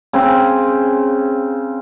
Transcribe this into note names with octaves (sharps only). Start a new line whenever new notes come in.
C#3 C4